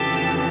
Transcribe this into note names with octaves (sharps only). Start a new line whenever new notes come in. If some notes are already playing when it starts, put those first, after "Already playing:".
Already playing: F2 C#3 E3 G4 A4